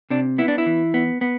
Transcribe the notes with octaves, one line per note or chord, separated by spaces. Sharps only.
C3 D4
B3 E4
D4
E4
E3
B3
B3